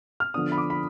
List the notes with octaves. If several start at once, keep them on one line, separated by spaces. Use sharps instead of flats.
F6
D3 F3 B3 D4 D#6
B5
D6
B5